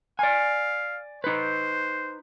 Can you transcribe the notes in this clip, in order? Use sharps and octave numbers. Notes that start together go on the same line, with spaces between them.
D5 F5 G#5
D#4 B4 C5